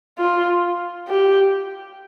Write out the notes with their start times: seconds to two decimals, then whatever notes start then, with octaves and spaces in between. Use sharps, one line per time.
0.18 F4
1.08 G4